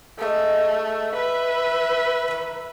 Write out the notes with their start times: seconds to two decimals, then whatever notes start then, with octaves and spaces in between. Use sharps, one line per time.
0.19 G#3 A3 D#4 D#5
1.13 B4 E5
2.28 D#3 E3